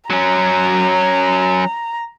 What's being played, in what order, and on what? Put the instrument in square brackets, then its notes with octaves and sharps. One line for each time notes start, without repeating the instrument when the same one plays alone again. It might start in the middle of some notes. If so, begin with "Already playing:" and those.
[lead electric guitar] F#3 C#4 [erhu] A#5